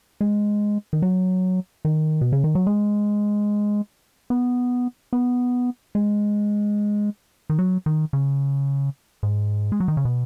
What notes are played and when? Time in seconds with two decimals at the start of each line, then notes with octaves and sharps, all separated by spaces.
0.21 G#3
0.93 D#3
1.02 F#3
1.85 D#3
2.21 B2
2.32 C#3
2.44 D#3
2.55 F#3
2.67 G#3
4.30 B3
5.13 B3
5.95 G#3
7.50 D#3
7.59 F#3
7.86 D#3
8.13 C#3
9.23 G#2
9.72 G#3
9.80 F#3
9.88 D#3
9.97 C#3
10.05 B2